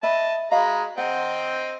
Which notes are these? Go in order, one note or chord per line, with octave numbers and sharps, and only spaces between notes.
D#5 E5 A5 B5
G#3 F#4 D#5 F5 A#5 B5
C4 D#5 F#5 G5